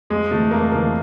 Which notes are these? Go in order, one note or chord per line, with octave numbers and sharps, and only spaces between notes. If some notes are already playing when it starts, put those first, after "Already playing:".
F2 G#3
C3 E3 A3
F2 A#3
C3 E3 A#3